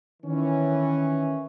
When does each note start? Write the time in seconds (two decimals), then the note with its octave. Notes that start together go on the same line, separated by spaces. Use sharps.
0.23 D#3 E3 C#4